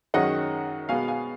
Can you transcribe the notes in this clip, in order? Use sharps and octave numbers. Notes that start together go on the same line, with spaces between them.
F#2 D#3 G#3 C#4 D#5 F#5
B2 G#3 B3 F5 G#5
F5 G#5